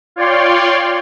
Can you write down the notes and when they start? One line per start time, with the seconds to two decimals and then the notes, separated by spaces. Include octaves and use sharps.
0.16 F4 C#5 D5 G5 C6